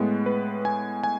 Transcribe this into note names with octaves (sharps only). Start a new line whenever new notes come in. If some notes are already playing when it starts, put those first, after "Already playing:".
Already playing: A2 G#3 B3
B4
G#5
G#5